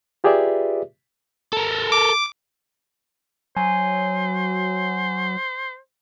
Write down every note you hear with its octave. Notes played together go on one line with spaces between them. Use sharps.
F4 G4 G#4 B4 D5 E5
A4 A#4
D6
F#3 C5 G#5